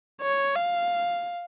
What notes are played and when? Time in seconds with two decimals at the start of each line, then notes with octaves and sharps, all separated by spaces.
0.22 C#5
0.56 F5